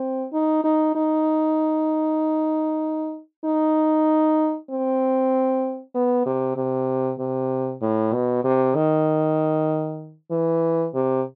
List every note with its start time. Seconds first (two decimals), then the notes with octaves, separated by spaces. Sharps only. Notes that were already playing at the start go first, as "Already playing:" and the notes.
Already playing: C4
0.33 D#4
0.64 D#4
0.95 D#4
3.45 D#4
4.70 C4
5.95 B3
6.26 C3
6.57 C3
7.19 C3
7.82 A2
8.13 B2
8.44 C3
8.75 D#3
10.31 E3
10.94 C3